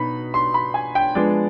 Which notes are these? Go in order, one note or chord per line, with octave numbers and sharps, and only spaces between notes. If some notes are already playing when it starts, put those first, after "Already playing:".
Already playing: B2 B3 D#4 B5
C6
B5
G#5
G5
F3 G#3 B3 D4 D5